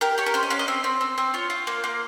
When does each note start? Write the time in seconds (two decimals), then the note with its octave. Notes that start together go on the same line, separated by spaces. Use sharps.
0.01 G4 A#4
0.18 G4 C#5
0.26 A#4
0.34 C#4 C5
0.43 D#5
0.50 C#4 F5
0.59 D#5
0.68 C4 C5
0.84 C4
1.01 C4
1.18 C4
1.34 F4 C#5
1.50 F4
1.67 A#3 C5
1.84 A#3